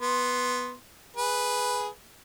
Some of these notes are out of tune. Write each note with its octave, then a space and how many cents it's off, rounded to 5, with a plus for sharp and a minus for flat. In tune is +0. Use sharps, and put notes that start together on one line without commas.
B3 +0 C6 +0
G#4 +0 B4 +0